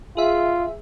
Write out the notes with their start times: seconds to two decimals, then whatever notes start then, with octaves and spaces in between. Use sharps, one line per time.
0.17 F4 G#4 E5